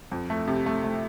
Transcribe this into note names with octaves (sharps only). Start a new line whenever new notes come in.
F2
A3
C3
A3
A3